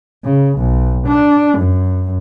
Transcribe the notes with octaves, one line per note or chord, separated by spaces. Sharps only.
C#3
B1
D4
F#2